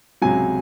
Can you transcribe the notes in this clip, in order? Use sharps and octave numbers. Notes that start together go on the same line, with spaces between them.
C#2 C3 F#3 G#5